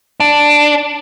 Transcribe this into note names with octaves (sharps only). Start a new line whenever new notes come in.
D4